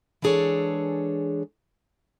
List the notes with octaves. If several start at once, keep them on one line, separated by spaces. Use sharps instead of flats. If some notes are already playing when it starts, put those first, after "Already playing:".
E3 G#3 D4 G#4 A4 C#5